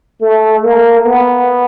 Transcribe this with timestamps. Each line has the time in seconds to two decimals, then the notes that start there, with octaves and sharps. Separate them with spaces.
0.21 A3
0.63 A#3
1.05 B3